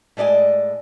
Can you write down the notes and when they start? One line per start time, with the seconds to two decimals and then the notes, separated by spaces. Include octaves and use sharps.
0.17 A2 G#3 D5 D#5 G#5